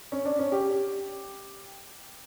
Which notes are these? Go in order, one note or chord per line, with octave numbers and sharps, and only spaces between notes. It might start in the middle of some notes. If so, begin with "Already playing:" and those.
C#4
D4
C#4
G4